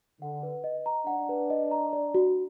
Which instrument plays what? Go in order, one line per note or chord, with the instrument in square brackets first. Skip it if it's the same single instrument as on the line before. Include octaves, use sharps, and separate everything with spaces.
[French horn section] D3 [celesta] F#5
[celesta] B4
D#5
A#5
[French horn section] D4 [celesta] F#5
[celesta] B4
D#5
A#5
D5
F#4